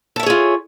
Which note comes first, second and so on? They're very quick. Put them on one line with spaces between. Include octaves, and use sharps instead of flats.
A4 E5 C#5 G#4 F4